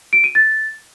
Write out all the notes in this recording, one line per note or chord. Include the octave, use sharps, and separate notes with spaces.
D7
D#7
A6